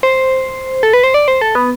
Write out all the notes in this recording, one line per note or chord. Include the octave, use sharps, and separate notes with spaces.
C5
A4
B4
C5
D5
C5
A4
B3